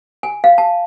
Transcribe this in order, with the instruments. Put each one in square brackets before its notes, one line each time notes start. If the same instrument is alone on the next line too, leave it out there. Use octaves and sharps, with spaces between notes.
[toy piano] G#5
F5
A5